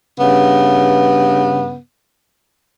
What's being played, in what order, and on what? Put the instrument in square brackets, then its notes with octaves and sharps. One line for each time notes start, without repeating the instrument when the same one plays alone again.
[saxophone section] G2 C#3 B3